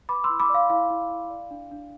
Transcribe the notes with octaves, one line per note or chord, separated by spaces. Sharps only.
B4 B5 D6
C6 E6
E4
B5 D6
D5 F5
E4 F5
E4
E4
D5
D4
D4